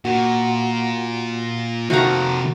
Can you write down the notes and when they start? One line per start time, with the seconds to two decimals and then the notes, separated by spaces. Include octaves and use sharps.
0.05 A#2 F#4
1.90 C3 D#3 F3 A3 A#3 F#4 A#5